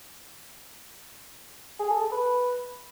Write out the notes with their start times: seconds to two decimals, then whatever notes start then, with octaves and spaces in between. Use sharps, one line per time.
1.79 G#4
1.90 A4
2.01 A4
2.12 B4